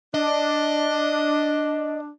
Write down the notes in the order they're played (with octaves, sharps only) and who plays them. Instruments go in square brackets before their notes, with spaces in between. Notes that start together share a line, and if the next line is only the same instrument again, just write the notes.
[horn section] D4 [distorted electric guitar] D#5